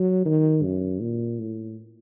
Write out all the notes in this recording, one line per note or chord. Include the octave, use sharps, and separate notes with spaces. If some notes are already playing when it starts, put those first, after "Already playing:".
Already playing: F#3
D#3
F#2
A#2
A2